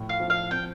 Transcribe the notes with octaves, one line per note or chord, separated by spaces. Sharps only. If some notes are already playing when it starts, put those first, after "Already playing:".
Already playing: A2 F3
F5
F3
F5
C4 G5